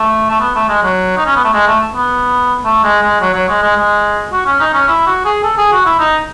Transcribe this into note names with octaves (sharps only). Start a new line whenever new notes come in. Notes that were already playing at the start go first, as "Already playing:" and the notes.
Already playing: A3
A3
B3
A3
G#3
F#3
D#4
C#4
B3
A3
G#3
A3
B3
A3
G#3
G#3
F#3
F#3
G#3
G#3
G#3
F#4
C#4
D#4
C#4
E4
F#4
G#4
A4
G#4
F#4
E4
D#4